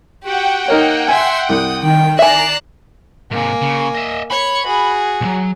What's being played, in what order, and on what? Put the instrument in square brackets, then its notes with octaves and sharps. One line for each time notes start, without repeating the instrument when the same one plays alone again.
[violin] F#4 G4 [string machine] F#5 G5
[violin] A#3 [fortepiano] D#4 A#4 C#5
[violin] E5 C6 [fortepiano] G#5
[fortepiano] C2 [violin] D#6
[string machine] D#3 [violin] G5
[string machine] D5 A#5 C7 [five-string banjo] E5 G#5 [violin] F#6 E7
[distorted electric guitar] G#2 C3 [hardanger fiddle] A#3 G#5
[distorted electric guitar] C#3
D#5 E5
[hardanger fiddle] C#5 C#6 [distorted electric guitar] B5
[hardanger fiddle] F#4 G#4
[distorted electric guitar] B1 F#3